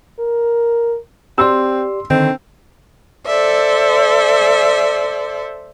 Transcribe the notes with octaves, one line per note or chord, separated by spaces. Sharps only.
A#4
C4 G4 D5 C6 E6
D3 D#3 C4
A4 C5 D5 E5